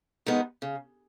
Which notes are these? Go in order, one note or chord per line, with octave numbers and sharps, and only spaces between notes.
D#3 G#3 B3 D#4
C#3